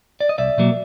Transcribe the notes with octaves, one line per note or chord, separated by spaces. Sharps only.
D5
D#5
C2 D5 E5
B2 F#3 A#3